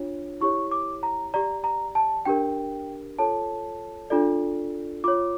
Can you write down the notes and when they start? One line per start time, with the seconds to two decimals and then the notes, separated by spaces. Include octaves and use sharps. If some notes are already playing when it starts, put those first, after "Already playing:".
Already playing: D4 F4 C#5
0.41 E4 G4 C#5 C#6
0.71 D6
1.03 A#5
1.34 G4 D5 A#5
1.64 A#5
1.95 A5
2.25 D4 G4 A#4 G5
3.18 F4 A4 C#5 A5
4.10 D4 F4 A4 D5
5.04 F4 C#5 D6